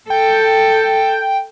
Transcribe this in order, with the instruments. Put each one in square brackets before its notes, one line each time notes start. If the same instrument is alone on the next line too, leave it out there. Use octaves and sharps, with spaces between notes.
[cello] A4 [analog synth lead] G5